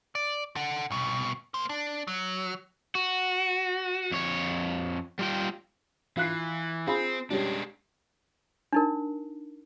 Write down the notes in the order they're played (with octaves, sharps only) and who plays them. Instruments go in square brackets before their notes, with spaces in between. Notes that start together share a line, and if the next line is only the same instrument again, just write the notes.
[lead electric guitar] D5
A4 F#5
C2 B2
A#3 C5
D4
F#3
[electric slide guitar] F#4
F2 C#5
G3 F4 G5
[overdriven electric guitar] E3 [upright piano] F4 F#6 C7
[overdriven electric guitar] C4 [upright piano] F4 G#4 B5
[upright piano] G3 C#4 G4 [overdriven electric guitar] G#3 D4
[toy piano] D4 D#4 A#4